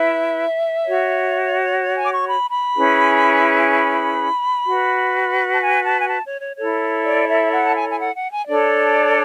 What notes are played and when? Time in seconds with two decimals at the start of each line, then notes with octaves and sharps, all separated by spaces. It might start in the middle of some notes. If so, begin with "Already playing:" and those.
Already playing: E4 B4 E5
0.84 F#4 C#5
1.95 G#5
2.04 D6
2.11 C#6
2.28 B5
2.51 B5
2.75 C#4 E4 G#4 B4
3.71 B5
4.66 F#4 B4
5.54 A5
5.62 G#5
5.85 A5
6.00 G#5
6.09 A5
6.25 C#5
6.41 C#5
6.57 E4 A4 C#5
7.04 D5
7.28 E5
7.52 F#5
7.64 A5
7.75 G#5
7.90 G#5
8.00 F#5
8.16 F#5
8.31 G#5
8.47 D4 A4 C#5 D5